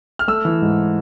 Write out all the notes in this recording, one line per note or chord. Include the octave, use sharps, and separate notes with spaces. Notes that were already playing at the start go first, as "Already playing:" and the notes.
F6
A3 E6
E3
G#2